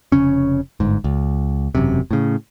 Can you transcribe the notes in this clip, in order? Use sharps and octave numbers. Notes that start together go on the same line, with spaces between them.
F1 C#2 C#3 C#4
G1 G#2
C#2
E1 F#2 C3
A2 C#3